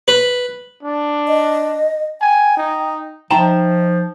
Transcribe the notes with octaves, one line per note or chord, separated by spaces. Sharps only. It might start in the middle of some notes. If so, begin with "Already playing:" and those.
B4
D4
D#5
G5 G#5
D#4
F3 D#4 E5 G5 A5 A#5 C6